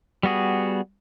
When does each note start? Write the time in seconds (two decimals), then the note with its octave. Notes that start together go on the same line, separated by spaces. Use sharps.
0.23 G3 B3 F#4 G#4